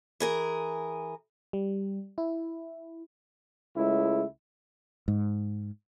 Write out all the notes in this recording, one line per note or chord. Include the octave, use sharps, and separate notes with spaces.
E3 G#4 A#4
G3
E4
C#2 G#3 A3 E4
G#2